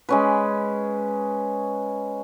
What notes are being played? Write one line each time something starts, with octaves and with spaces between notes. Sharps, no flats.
G#3 C#4 B4